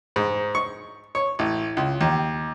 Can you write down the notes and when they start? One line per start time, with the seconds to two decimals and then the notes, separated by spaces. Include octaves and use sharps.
0.16 G#2
0.55 C#6
1.15 C#5
1.39 A1
1.77 C#2
2.01 D#2